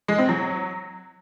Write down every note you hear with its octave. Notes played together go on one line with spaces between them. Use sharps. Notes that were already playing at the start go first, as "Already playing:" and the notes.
G#3
C4
F#3